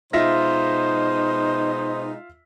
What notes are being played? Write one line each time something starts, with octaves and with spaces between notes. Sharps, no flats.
B2 G#3 D#4 F4 C5 E5 A#6